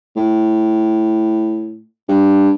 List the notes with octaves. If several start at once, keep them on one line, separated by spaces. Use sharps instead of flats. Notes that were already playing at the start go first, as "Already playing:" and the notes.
A2
G2